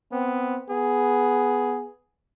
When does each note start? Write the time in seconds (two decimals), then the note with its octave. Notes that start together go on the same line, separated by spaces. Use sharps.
0.12 B3 C4
0.70 B3 G#4